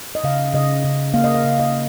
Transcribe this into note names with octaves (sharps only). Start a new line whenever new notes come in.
D#5
C#3 F5
C#3 D#5
C#3
A#3 F5
D#5
F5
C#3
D#5